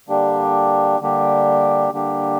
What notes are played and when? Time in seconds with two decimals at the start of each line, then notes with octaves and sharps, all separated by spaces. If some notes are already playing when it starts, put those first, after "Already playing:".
0.08 D3 G3 A#3 D4 G4
1.00 D3 G3 A#3 D4 G4
1.92 D3 G3 A#3 D4 G4